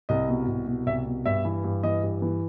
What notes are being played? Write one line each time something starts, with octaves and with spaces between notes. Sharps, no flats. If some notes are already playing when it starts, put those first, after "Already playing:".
C2 D#5
B2
C2
B2
C2 E5
B2
G2 E5
E3
G2
E3 D#5
G2
E3